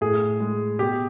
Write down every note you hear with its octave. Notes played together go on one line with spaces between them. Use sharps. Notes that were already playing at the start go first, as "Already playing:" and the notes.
A2 G#4
G#3
B2 G4